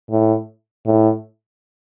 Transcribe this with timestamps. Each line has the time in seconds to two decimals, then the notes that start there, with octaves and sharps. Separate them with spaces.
0.11 A2
0.86 A2